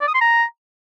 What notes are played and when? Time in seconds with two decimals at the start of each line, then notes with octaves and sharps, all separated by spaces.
0.01 D5
0.08 D#6
0.14 C6
0.21 A#5